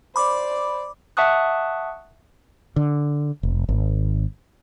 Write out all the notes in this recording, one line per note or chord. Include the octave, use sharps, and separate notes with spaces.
C5 D5 B5 D6
E5 F#5 A5 C#6 D#6 F#6
D3
F1
G#1